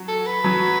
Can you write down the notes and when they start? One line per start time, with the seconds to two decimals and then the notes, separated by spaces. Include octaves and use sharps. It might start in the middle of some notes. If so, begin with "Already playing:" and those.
Already playing: F#3
0.08 A4
0.26 B4
0.44 F#3